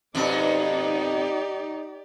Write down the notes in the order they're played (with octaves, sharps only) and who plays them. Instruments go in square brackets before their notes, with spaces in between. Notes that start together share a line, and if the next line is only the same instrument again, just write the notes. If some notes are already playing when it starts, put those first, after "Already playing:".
[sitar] F2 B2 D4 [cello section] D#4 [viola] G4 D5